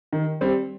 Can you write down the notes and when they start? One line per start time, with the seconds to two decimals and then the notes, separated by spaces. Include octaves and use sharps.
0.13 D#3
0.41 G3 C4